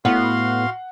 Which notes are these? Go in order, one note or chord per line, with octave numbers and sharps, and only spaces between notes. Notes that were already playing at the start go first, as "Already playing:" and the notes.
A2 B3 F#4 F5 F#5 C6